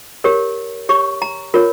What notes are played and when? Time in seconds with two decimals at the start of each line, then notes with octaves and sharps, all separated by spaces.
0.24 G4 A#4 C#5
0.89 G4 C#5 C#6
1.22 A#5
1.54 F4 A#4 C#5